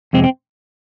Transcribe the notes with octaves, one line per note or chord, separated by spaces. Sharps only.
F2 C3 G#3 C4
C4